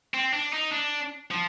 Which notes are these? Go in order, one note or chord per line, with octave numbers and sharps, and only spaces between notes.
C4
D4
D#4
D4
F3